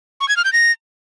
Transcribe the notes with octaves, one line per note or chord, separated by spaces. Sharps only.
C#6
G#6
F6
G6
A#6